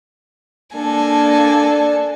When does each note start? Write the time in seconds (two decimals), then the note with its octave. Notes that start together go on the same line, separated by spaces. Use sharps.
0.75 A#3 D4 A4 G#5